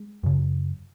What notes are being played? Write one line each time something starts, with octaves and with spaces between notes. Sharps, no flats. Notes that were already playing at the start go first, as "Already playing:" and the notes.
Already playing: G#3
F#2 C#3